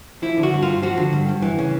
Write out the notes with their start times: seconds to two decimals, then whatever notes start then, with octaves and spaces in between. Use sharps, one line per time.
0.22 F3 E4
0.37 D3
0.43 F#4
0.54 G2
0.63 F4
0.68 G2
0.82 F3 F#4
0.98 D3
1.13 G2
1.29 G2
1.42 E3
1.59 C#3